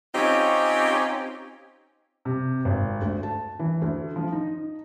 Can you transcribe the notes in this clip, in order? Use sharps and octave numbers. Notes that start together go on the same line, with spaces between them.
C4 C#4 D#4 F4 G4
C3
G#1
D2
A5
E3
D2
F3
D#4